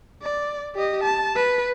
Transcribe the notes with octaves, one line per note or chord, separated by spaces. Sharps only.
D5
G4 D#5
A5
B4